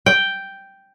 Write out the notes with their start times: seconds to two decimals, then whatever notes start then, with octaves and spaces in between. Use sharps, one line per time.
0.06 G5